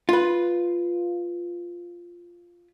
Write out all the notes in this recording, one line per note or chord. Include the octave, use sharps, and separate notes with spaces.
F4 B4